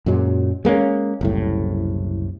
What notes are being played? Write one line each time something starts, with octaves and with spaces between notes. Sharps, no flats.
F#2 A#2 F#3 G#3
G#3 A#3 B3 C#4
F#1 C2 A2